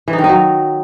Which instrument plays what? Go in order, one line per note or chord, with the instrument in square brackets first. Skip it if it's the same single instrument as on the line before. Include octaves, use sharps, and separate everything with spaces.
[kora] E3
D#4
D#3
D#4
F#3